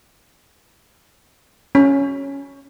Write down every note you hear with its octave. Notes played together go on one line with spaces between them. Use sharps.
C#4